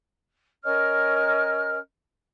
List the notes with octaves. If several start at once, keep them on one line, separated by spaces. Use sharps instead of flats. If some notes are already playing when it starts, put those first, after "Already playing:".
C#4 A#4 D#5 F6